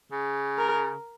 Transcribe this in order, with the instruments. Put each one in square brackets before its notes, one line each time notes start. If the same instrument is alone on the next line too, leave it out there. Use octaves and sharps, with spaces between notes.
[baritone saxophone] C#3
[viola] A#4